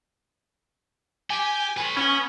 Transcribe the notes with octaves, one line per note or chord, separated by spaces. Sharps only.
G4 G#5
B4 C#5
B3 C#4